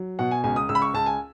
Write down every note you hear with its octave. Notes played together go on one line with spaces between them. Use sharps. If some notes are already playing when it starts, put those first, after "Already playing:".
Already playing: F#3
B2 F#5
G#5
C#2 G#5
D#6
C#2 E6
B5
C#6
C#2 A5
G#5